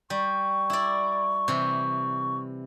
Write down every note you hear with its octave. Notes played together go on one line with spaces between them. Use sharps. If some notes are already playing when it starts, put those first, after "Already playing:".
G3 C#6
E4 D5
C3 E3